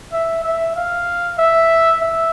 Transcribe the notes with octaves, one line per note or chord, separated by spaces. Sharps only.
E5
E5
F5
E5
E5